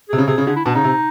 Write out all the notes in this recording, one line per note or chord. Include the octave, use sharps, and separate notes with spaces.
C3 G#4
C#3
C3 G#4
C#3
D3 G#4
E4
B2 D4
C#3 D#4
C3